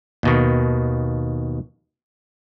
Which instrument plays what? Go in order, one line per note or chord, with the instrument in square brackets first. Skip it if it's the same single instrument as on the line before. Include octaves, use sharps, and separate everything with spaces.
[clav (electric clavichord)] D#2 B2 D#3